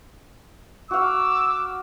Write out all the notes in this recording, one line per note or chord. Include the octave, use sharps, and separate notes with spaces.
F#4 F5 D6 E6